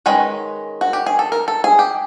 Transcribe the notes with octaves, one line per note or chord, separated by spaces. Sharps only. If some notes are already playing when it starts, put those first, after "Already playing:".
D#3 G#3 C#4 B4
F#4
G4
G#4
A4
A#4
A4
G#4
G4